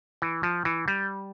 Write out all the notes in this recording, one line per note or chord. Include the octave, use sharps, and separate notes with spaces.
E3
F3
E3
G3